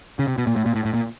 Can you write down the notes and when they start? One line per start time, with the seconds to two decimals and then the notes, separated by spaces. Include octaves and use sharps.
0.19 C#3
0.28 C3
0.38 B2
0.47 A#2
0.56 A2
0.66 A#2
0.75 A2
0.85 A2
0.94 A#2